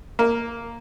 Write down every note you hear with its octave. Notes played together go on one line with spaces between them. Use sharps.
A#3